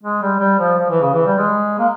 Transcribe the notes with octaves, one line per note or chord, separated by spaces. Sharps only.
G#3
G3
G3
F3
F3
E3
C#3
E3
G3
G#3
A#3